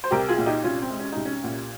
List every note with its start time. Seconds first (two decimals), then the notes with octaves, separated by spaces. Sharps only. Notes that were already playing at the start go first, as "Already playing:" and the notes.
0.04 C5
0.11 C2 G4 A#4
0.28 F4 G#4
0.38 A#2
0.46 D#4 G4
0.64 C2 C#4 F4
0.82 C4
0.90 G#3
0.99 C#4
1.12 C2 D#4
1.25 C#4
1.44 A#2